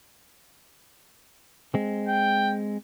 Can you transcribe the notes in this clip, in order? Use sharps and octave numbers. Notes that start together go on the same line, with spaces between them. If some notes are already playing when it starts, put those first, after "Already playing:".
G#3 C4
G5